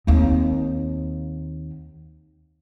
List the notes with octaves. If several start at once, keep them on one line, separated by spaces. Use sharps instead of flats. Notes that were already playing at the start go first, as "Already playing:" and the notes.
D#2 C4